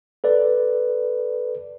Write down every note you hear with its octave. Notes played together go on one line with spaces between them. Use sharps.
A4 B4 D5